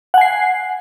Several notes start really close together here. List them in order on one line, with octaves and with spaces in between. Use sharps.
F#5 G#5 C7